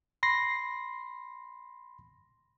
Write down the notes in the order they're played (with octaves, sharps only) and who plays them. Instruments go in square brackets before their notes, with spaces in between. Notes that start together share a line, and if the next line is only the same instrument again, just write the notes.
[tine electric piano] B5 C6 A#6 C7